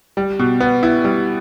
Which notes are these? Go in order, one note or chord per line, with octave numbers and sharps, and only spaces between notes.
G3
B2
B3
E4
G3